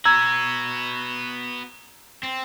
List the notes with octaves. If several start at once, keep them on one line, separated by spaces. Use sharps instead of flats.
B3 F#4 A#5 E6 G#6
C4